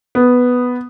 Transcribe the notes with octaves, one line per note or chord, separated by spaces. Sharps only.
B3